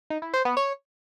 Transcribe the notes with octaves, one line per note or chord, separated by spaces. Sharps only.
D#4
E4
C5
B3
C#5